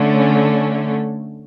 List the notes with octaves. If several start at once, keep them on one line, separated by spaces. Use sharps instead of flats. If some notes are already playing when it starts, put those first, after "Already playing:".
Already playing: D3 A3 C#4